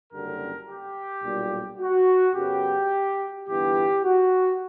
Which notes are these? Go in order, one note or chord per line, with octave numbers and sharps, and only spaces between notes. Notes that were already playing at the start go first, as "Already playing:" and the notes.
F#1 F#2 D3 G3 A#4
G4
B1 A#2 G3
F#4
F#2 C#3 F#3 B3 G4
G1 G2 E3 B3 E4 G4
F#4